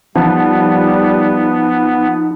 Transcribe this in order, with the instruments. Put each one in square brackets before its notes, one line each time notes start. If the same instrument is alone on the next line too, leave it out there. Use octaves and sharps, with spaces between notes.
[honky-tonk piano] F3 [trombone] G3 [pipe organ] B3 [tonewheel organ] D#4